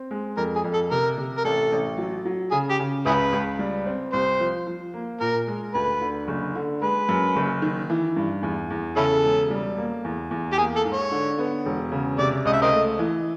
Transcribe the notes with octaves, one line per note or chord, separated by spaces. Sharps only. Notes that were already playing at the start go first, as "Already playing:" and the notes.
Already playing: C4
G#3
F2 A#4
G#4
F2
A4
C3 A#4
C3
A#4
A1 A4
A1
F#3
F#3
C#3 G#4
G4
C#3
C#2 E4 G#4 B4
C#2
G3
C4
C2 C5
F3
F3
A#3
A#2 A#4
G#3
D2 B4
D3
F#1
D3
G#3 B4
F#2
F#1
D#3
E3
G2
E2
E2
C#3 C#4 E4 A4
E1
G3
A#3
E2
E2
G4
A#3 G#4
A4
G#2
C#5
D3
B3
E1
C#3
C3 D5
C#2 D#5
E5
A#4 C5 D#5
A3
E3